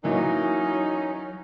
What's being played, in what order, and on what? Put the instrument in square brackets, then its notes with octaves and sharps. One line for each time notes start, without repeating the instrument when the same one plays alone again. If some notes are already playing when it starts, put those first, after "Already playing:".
[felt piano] E3 A#3 [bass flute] F#3 [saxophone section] C#4 D#4